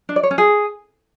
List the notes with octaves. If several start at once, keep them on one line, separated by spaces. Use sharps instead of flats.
D4
D5
C#5
C#4
G#4